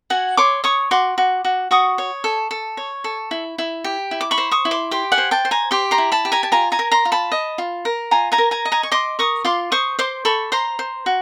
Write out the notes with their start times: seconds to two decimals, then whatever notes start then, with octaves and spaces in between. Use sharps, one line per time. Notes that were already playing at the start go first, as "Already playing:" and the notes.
0.10 F#4 F#5 G#5
0.37 C#5 C6 D6
0.64 C#5 C#6 D#6
0.91 F#4 C6 D6
1.18 F#4
1.45 F#4
1.71 F#4 C#6 D#6
1.98 C#5
2.24 A4
2.51 A4
2.77 C#5
3.04 A4
3.31 E4
3.58 E4
3.84 G4
4.11 E4
4.21 D6
4.31 B5 C#6
4.38 C5
4.51 C#6 D#6
4.65 E4
4.71 C6 D6
4.91 G4 C6 D6
5.12 F#5 G#5
5.18 C5
5.31 G5 A5
5.45 C5
5.51 G#5 A#5
5.71 G4 C6 D6
5.91 A#5 C6
5.98 E4
6.12 A5 B5
6.25 G4
6.32 G#5 A#5
6.43 A5
6.52 F4 G#5 A#5
6.72 G#5 A#5
6.79 A#4
6.92 A#5 C6
7.05 F4
7.12 A5 B5
7.32 D#5
7.58 F4
7.85 A#4
8.11 F4 G#5 A#5
8.32 G#5 A#5
8.38 A#4
8.51 G#5 A#5
8.65 D#5
8.72 G#5 A#5
8.83 C#6
8.91 D#5 C6 D6
9.19 A#4 C#6 D#6
9.45 F4 C6 D6
9.72 C5 C#6 D#6
9.99 C5 C6 D6
10.25 A4 B5 C#6
10.52 C5 A#5 C6
10.79 C5
11.06 F#4